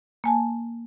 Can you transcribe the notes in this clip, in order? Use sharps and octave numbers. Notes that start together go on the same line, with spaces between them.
A#3 G#5 A5